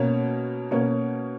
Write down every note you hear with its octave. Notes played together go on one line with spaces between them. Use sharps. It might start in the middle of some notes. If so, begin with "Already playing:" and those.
Already playing: B2 A#3 C#4
B2 A#3 C#4